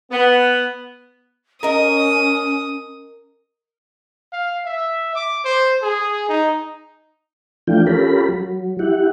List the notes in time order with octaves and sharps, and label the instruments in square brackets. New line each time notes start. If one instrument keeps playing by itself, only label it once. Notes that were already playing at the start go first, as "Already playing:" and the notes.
[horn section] B3
[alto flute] C#4 [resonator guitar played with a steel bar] A#4 D#5 [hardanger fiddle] D#6
[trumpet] F5
E5
D6
C5
G#4
D#4
[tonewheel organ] E3 F3 A3 D4 F4 G5
C#4 F4 G4 A4 A#4 B5
F#3
E4 G4 F#5